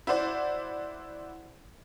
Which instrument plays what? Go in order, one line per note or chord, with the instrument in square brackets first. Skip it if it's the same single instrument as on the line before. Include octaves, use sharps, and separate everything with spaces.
[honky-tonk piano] E4 F#4 C5 D5